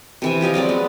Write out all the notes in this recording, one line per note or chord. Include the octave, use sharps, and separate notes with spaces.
C3 E3 E5
F3 G4 D#5 F5
F#3 G#3 C4 D5
B3